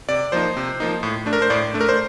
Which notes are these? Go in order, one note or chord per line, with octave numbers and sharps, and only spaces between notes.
C3 D5
F3 A#3 D#4 C5
C3
F3 A#3 D#4
A2
A3 D4
A#4
C5
A2 D5
A3 D4
A#4
C5